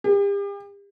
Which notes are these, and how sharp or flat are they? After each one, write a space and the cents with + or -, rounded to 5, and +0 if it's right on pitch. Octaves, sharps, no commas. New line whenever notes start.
G4 +40